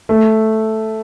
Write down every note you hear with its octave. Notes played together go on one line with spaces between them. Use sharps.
A3